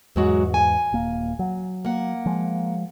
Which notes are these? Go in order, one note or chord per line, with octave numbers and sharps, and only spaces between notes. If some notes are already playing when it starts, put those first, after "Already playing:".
E2 G#2 F#3 G#3 F#4
G#5
D#1 A#3
F#3
A#3 F#5
F3 G#3